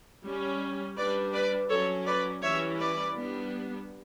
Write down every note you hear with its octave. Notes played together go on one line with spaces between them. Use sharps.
G3 C#4
G3 D4 B4 D5
B4 D5
F#3 C#4 A4 C#5
B4 D5
E3 G3 C#4 C#5 E5
B4 D5
G3 B3 D4